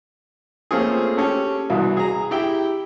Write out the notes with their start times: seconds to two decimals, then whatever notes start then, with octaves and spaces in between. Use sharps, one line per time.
0.71 A3 A#3 C4 C#4 F4 G#4
1.17 C#4 G4 A4
1.70 C2 B2 E3
1.97 G#4 A#5
2.31 E4 G4 G5